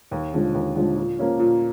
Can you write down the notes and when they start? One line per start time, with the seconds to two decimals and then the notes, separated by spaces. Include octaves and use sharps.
0.11 D#2
0.33 D3 F3 G#3
0.54 D#2
0.75 D3 F3 G#3
0.97 A#2
1.19 F3 A#3 C#4
1.39 A#2